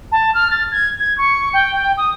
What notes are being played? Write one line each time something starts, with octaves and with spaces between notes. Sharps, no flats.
A5
F6
A6
G#6
G#6
C#6
G5
G5
D#6